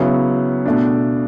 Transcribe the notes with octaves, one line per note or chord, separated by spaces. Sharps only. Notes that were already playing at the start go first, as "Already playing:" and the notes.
Already playing: C#3 F#3 B3 E4
B2 A3 D4